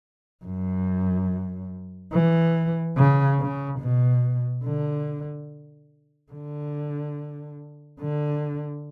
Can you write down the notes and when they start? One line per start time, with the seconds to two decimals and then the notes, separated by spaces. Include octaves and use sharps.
0.45 F#2
2.13 E3
2.97 C#3
3.39 C#3
3.80 B2
4.65 D3
6.32 D3
8.01 D3